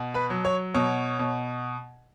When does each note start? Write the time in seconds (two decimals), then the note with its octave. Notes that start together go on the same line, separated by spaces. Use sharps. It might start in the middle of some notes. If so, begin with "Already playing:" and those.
Already playing: B2
0.14 B4 B5
0.30 F#3
0.45 C#5 C#6
0.74 B2 C#5 C#6
1.19 B2